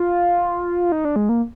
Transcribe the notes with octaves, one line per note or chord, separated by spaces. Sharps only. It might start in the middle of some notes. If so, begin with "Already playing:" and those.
Already playing: F4
D#4
D4
G#3
A#3